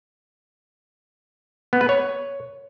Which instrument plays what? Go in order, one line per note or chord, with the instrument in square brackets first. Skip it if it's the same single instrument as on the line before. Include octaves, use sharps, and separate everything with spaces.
[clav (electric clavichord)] B3
B4
C#5